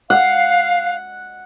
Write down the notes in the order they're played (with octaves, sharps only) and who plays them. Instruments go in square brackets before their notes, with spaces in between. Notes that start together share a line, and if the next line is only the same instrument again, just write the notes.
[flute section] F5 [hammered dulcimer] F#5